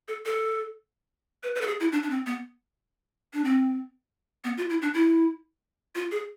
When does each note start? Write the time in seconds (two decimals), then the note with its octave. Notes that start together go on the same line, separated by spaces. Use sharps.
0.08 A4
0.26 A4
1.43 B4
1.55 B4
1.61 A4
1.67 G#4
1.80 E4
1.92 D4
2.03 D4
2.10 C4
2.26 B3
3.33 D4
3.44 C4
4.44 B3
4.57 F4
4.70 E4
4.82 D4
4.94 E4
5.95 F4
6.11 G#4